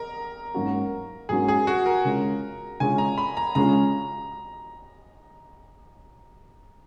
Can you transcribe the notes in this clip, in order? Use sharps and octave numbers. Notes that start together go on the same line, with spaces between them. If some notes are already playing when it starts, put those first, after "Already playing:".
Already playing: A#4 A#5
G#2 F#3 A#3 C#4 F#4
G#2 F#3 A#3 C#4 F#4 G#4
G#4
F#4
A#4
C#3 G#3 C#4 F4
C#3 G#3 C#4 F4 G#5
A#5
B5
A#5
C#3 G#3 C#4 F4 A#5